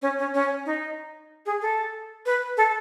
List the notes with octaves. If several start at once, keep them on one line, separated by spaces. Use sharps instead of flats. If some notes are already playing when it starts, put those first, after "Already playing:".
C#4
C#4
C#4
D#4
G#4
A4
B4
A4